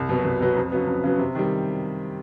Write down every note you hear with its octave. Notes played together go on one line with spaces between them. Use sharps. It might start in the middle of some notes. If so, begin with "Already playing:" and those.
Already playing: C2
B2 F#3 B3
C2
B2 F#3 B3
F2
C#3 F#3 B3
F2
C#3 F#3 B3
C3
D#3 G3